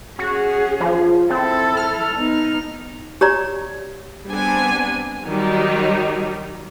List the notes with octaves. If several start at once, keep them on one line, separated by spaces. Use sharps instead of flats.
C#4 F#4 G#4
F3
C4 E4 A4
F6
B3 D#4
G4 C#5 D5 A#5
G3 B3 C4 D4 G#5
D#3 F#3 G3 D#4